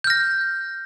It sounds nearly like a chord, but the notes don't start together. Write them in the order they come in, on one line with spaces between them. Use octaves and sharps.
G6 F6 A#6